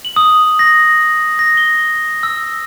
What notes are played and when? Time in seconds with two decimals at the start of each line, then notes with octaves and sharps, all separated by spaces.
0.05 F#7
0.16 D#6
0.59 A#6
1.39 A#6
1.57 G7
2.23 E6